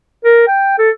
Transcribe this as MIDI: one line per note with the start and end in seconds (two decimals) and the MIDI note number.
0.24 0.45 70
0.48 0.76 79
0.78 0.90 69